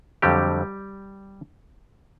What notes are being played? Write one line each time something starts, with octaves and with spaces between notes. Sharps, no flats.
F2 D3 F#3 G3 G4